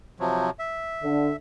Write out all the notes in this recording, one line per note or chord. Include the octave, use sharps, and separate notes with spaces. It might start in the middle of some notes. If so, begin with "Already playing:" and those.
C3 F3 F#3
E5
D3